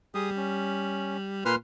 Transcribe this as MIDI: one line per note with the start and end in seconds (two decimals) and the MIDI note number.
0.15 1.42 55
0.15 0.30 68
0.15 0.30 87
0.37 1.17 61
1.45 1.55 46
1.45 1.56 71
1.45 1.56 84
1.45 1.56 89